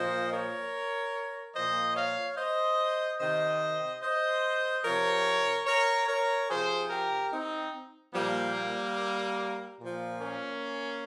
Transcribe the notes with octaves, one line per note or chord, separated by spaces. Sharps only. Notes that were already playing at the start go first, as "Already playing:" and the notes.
Already playing: A#2 F3 C5 D#5
A#4 C#5
A#2 F3 C5 D#5
C#5 F5
C5 D#5
C3 D#3 C5 D#5
C5 D#5
C3 F3 A#4 C#5
A#4 C#5
A#4 C#5
C3 F3 G#4 C5
G4 A#4
C4 D#4
A#2 F3 G3 A#3
A#2 F3
A#3 C#4